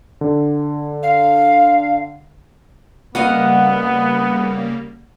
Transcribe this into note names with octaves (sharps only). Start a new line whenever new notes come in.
D3
F5
C#3 G3 A#3 B3 D#5 F5 F#5